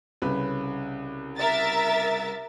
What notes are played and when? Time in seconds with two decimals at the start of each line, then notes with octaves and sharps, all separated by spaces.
0.22 C2 C#3 B4
1.39 A#4 E5 A6